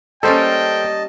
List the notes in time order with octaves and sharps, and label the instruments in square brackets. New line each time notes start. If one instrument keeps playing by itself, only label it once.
[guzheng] G3 A#3 C#4 [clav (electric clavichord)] A4 C5 [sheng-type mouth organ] D#5 A5 [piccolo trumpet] G5